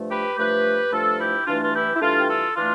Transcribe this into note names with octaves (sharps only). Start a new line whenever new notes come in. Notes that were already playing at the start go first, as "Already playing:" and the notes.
Already playing: G2 F3 A3
G4 B4
G2 F3 A3 G4 B4
G2 F3 A3 F4 A4
E4 G4
G2 E3 A3 D4 F4
F4
E4 G4
E4
G2 E3 A3 D4 F4
G4
F4 A4
E3 A3 D4 F4